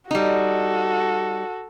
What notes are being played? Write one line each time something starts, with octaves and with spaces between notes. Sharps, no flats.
G3 D#4 F#4 A4